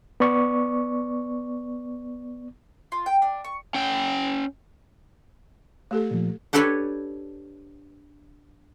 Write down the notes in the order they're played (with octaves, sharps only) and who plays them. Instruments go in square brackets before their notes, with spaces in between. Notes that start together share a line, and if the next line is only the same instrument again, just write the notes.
[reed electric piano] B3 D5 C#6
[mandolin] F4
G5
D4
C#6
[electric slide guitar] C#4 G5
[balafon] A3 G4 A4
[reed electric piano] A#2 F3
[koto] D4 G4 A4 B4 C#5 G#5